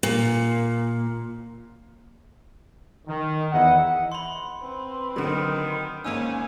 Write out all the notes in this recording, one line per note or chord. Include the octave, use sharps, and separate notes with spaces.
A#2
D#3
E2 E4 D#5 F#5
B5 C6
C4 B4
D3 D#3 F#3
G#1 A#3 C#4 D#4 G#5 E6